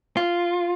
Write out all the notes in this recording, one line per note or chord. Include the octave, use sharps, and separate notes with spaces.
F4